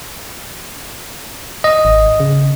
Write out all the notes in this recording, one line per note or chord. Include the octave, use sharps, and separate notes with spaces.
D#5
G#1
C#3